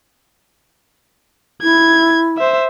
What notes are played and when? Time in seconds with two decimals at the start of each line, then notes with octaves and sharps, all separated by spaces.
1.63 E4 G#6
2.38 C5 E5